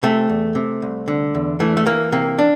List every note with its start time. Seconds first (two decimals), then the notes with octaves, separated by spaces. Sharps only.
0.03 C3 A3
0.29 E2
0.55 C3
0.82 C2
1.08 D3
1.35 E2
1.60 E3 A3
1.77 A3
1.86 E3 A#3
2.12 C3 A#3
2.39 D4